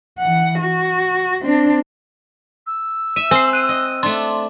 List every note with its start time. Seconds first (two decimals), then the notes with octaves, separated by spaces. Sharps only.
0.20 E3 F#5
0.59 F#4
1.42 C4 D4
2.66 E6
3.16 E5 D#7
3.31 C4 G#5 C7
3.53 F#6 D#7
3.69 D#5
4.03 A3 D4 C6